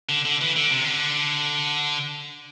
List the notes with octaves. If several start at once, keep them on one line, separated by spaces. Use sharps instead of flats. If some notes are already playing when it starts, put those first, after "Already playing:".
D3
D3
E3
D3
C3
D3